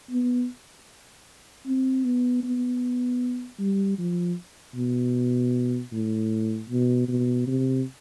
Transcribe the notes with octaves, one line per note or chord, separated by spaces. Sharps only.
B3
C4
B3
B3
G3
F3
B2
A2
B2
B2
C3